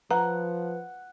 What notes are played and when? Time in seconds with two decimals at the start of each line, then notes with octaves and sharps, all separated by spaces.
0.11 F3 B4 F#5 A#5